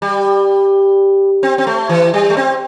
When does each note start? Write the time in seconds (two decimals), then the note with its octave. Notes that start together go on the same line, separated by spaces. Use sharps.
0.02 G3
1.43 C4
1.58 C4
1.67 A3
1.89 E3
2.14 G3
2.30 A3
2.37 C4